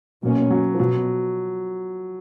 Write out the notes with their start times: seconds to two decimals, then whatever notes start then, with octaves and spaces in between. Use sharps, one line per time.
0.22 B2 F#3 A#3 C#4
0.51 F#3
0.74 F3
0.79 B2 F#3